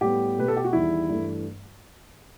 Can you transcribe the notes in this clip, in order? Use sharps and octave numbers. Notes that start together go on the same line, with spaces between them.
A2 G3 B3 G4
B2 A3 B4
A4
G4
F#4
E2 D#3 G3 E4
G2 E3 A3